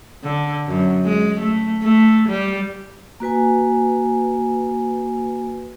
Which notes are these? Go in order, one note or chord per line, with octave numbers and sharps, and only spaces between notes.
D3
F#2
G#3
A3
A3
G3
A#3 F#4 B4 G#5